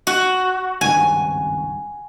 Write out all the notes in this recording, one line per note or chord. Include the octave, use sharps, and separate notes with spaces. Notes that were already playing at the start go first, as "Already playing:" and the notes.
F#4
G#1 C#2 G2 G#5